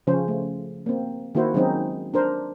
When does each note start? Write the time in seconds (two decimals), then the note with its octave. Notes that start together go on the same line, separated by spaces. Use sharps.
0.07 C#3 F3 C#4 C5
0.28 A3
0.86 A#3 C4
1.35 D#3 A#3 E4 F#4 C5
1.54 D#3 F#3 G#3 C4 C#4 D#4
2.14 D4 A#4 C5